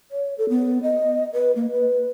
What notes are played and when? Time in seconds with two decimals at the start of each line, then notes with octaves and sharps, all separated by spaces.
0.11 C#5
0.38 A4
0.49 B3
0.83 D#5
1.33 B4
1.56 A#3
1.71 B4